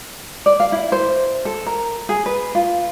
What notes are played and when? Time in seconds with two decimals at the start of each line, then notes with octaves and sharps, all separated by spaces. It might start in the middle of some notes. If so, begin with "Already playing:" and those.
0.46 D5
0.60 F5
0.72 E4
0.92 C5
1.45 A4
1.66 A#4
2.09 G#4
2.26 B4
2.55 F4